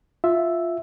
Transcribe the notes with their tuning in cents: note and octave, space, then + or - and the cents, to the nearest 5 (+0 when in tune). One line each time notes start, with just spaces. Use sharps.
F4 +0 E5 +0